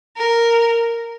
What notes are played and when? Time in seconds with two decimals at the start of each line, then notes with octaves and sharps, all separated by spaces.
0.17 A#4